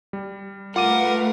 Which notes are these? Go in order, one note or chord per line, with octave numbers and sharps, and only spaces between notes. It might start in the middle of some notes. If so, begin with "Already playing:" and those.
G3
A3 F4 A#4 B4 F5 F#5 D6 D#7